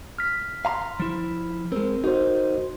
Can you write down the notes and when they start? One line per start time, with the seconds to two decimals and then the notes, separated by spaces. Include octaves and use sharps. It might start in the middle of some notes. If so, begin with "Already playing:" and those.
0.18 F6 B6
0.65 F5 A#5 C6
1.00 F3 E4
1.72 G#3 C4 A#4
2.04 D#4 F#4 A#4 C5